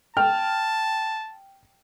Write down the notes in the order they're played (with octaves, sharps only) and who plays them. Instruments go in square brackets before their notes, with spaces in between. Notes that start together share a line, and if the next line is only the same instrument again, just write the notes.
[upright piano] G5 F6 [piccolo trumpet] A5